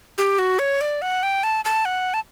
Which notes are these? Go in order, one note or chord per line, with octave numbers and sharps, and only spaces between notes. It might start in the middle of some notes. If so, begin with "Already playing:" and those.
G4
F#4
C#5
D5
F#5
G5
A5
A5
F#5
A5